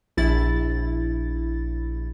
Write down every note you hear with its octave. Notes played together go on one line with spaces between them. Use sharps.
A#1 E4 A6